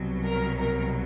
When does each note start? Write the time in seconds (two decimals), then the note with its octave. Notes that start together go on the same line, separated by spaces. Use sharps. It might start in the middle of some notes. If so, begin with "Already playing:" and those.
Already playing: C2 B2 F#3
0.25 A#4
0.57 A#4